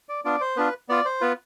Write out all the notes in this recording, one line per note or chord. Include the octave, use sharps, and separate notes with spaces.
D5
B3 D4 F4 D5
C5
B3 D4 F4 B4
B3 F4 D5
C5
B3 F4 B4